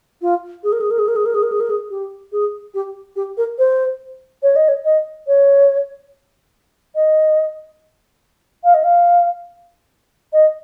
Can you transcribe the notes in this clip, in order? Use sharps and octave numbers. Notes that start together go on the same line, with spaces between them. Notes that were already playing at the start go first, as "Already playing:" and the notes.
F4
G#4
A#4
G#4
A#4
G#4
A#4
G#4
A#4
G#4
A#4
G#4
A#4
G#4
G4
G#4
G4
G4
A#4
C5
C#5
D#5
C#5
D#5
C#5
D#5
F5
D#5
F5
D#5